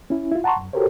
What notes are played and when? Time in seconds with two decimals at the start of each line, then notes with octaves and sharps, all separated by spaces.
0.10 C#4 E4
0.32 E4 F4
0.44 F#5 A5 A#5 C6 C#6
0.56 F#2
0.73 F#4 G4 A4 A#4 C5 C#5